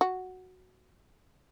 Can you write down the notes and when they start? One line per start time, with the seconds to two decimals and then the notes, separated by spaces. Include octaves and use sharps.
0.01 F#4